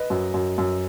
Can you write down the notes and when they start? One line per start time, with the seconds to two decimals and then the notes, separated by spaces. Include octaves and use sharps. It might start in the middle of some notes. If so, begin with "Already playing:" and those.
Already playing: B4 D#5
0.10 F#2
0.34 F#2
0.58 F#2